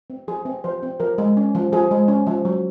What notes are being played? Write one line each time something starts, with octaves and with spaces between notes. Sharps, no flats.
C4
F3 G#4
C4
F3 C5
C4
F3 A#4
G#3
C#4
F3
F3 G#4
G#3
C#4
F3
F#3